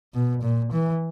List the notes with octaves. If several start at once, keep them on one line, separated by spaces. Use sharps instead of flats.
B2
A#2
E3